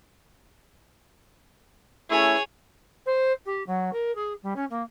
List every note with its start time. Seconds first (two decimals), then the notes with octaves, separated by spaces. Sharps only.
2.10 A3 C#4 E4 G#4 C#5
3.06 C5
3.46 G4
3.67 F#3
3.93 A#4
4.15 G#4
4.43 G3
4.56 C#4
4.70 A#3